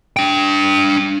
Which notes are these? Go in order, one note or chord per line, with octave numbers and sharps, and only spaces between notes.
D4 G5